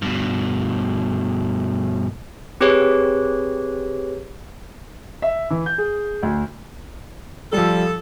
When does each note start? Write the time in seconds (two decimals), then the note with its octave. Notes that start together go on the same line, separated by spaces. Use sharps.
0.02 G2 B2
2.61 C4 G4 G#4 B4 C#5
5.22 E5
5.51 E3
5.66 G6
5.78 G#4
6.23 D2
7.53 F3 G3 A4